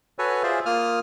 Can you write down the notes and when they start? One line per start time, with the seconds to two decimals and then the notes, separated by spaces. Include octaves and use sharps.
0.19 F#4 A4 B4 C#5 G#5
0.43 F4 G#4 C5 D5 E5
0.66 A#3 F4 D#6 F6